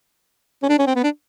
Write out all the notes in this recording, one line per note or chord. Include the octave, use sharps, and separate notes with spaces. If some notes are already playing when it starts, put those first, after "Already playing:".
C#4
D4
C#4
C4
B3
D4